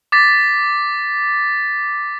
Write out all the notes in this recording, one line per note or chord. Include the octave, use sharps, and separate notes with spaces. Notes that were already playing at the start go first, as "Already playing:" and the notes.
D6 A6 B6